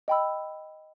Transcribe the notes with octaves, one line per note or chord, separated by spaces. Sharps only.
D#5 G5 B5 E6